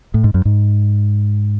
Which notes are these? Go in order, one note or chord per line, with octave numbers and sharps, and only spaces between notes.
A2
G#2
F#2
G#2